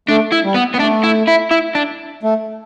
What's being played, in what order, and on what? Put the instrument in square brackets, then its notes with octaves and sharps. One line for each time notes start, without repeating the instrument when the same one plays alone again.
[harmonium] A3 [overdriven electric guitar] D4
[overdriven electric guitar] E4
[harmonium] G3
[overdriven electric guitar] B3
B3
[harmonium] A3 [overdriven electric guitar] D4
[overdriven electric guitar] E4
E4
E4
D4
[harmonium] A3